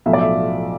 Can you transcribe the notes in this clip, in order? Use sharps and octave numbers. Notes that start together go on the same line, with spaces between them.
B1 A2 F3 E5
D5
E5